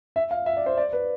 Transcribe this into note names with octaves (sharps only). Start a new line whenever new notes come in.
E5
F5
E5
D5
C5
D5
B4